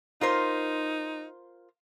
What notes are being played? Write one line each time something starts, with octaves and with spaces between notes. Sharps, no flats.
D#4 F4 A#4 C5